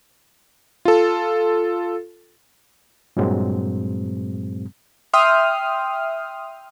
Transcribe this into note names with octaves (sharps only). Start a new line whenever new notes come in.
F4 A4
G2 A#2 F#3 G#3 C4
E5 G5 C6 D#6 F6